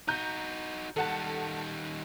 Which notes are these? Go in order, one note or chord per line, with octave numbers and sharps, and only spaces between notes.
D#4 F#4 A#5 G6
D#3 G3 A4 F#5 A5